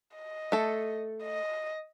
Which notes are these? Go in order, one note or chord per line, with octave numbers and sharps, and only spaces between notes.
D#5
A3 A4
D#5